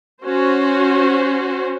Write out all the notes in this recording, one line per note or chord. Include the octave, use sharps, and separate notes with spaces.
C#4 F#4 C5